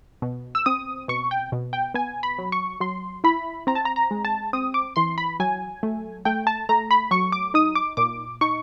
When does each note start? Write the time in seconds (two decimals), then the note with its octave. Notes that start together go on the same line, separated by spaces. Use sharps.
0.22 B2
0.55 E6
0.66 C4 D#6
1.08 B2 C#6
1.31 G5
1.52 B2
1.73 G5
1.94 B3 G#5
2.23 B5
2.38 F#3
2.52 C#6
2.80 F#3 C6
3.24 E4 B5
3.67 C4 A#5
3.75 A5
3.85 A#5
3.96 A#5
4.11 G#3
4.25 A5
4.53 C4 D#6
4.74 D6
4.96 E3 C6
5.18 B5
5.40 F#3 G#5
5.83 A3
6.25 A3 G5
6.47 A5
6.69 A3 A#5
6.91 B5
7.11 F#3 C#6
7.32 D6
7.54 D#4 D#6
7.75 D6
7.97 A#2 D6
8.41 D#4 C#6